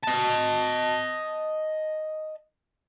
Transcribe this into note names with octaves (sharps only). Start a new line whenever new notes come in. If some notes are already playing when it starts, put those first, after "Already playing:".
D#5 A5